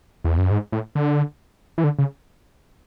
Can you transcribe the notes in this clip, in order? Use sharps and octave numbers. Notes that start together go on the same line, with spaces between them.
E2
F#2
G#2
A2
D3
E3
D3
C#3